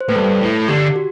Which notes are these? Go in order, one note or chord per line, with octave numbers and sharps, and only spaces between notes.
C5
A2 B4
G2 A4
A2
D3 G4
F#4